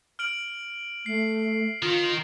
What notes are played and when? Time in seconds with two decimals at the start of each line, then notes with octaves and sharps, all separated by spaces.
0.19 F6 D7 F#7
1.06 A3 C7
1.82 D#3 F4